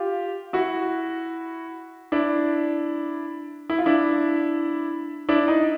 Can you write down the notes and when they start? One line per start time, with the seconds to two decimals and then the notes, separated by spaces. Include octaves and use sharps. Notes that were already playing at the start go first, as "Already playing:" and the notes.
Already playing: F4 G4
0.53 E4 F#4
2.12 D4 E4
3.70 E4
3.78 F4
3.86 D4 E4
5.29 D4 E4
5.48 D#4